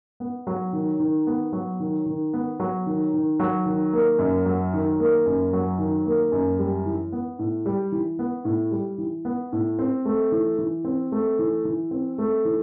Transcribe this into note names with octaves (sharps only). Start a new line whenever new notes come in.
B3
F#3
D#3
D#3
B3
F#3
D#3
D#3
B3
F#3
D#3
D#3
F#3
D#3
A#3
F#2
F#3
D#3
A#3
F#2
F#3
D#3
A#3
F#2
G3
E3
B3
A2
G3
E3
B3
A2
G3
E3
B3
A2
C4
A3
E3
E3
C4
A3
E3
E3
C4
A3
E3